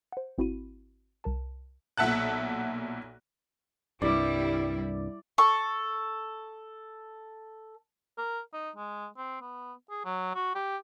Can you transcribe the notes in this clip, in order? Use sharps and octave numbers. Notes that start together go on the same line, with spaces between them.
C5 F#5
G#1 C4 E4 F#4 B5 D#7
C2 A#4 A5
B1 A#2 E5 F#5 A5 F#6
C2 G2 G3 E4 D5
A4 C#6
A#4
D#4
G#3
C4
B3
G#4
F#3
F#4
G4